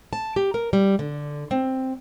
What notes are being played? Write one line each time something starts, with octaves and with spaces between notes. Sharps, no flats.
A5
G4
A#4
G3
D3
C4